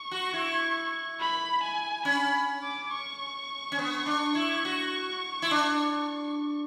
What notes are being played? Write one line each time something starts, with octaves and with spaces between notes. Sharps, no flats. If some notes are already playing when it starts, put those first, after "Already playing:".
Already playing: C#6
F#4
E4
B5
G#5
C#4 B5
D6
C#6
C#4
B3
D4
E4
F#4
E4
D4